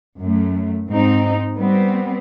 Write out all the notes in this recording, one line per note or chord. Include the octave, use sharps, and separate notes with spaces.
F#2 A3
G#2 C4 D#4
G3 B3 C4